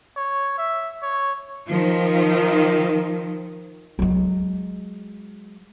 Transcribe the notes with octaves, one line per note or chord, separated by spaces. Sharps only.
C#5
E5
C#5
D#3 F3
F#3 G#3